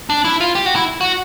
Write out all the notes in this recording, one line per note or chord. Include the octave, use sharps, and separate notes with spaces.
D4
E4
F4
G4
F#4
E4
F#4